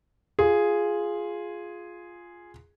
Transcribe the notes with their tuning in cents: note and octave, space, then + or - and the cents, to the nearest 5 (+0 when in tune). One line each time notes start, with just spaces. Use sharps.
F4 +0 G#4 +0